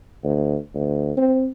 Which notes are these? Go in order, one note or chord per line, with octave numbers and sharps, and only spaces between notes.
D2
D2
C4